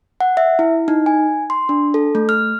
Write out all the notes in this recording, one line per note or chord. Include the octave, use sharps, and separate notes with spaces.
F#5
E5
E4
D#4
G#5
C6
D4
A4
A3
F6